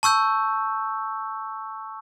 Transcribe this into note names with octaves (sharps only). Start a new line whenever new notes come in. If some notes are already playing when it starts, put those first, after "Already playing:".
A5 C#6 E6 G6